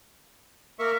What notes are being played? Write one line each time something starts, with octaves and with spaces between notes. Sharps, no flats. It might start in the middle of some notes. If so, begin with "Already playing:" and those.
A#3 A#4 E5 C#6